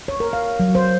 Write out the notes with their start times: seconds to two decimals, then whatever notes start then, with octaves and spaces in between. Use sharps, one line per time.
0.08 C#5
0.20 A#4
0.33 F5
0.60 F#3
0.75 C5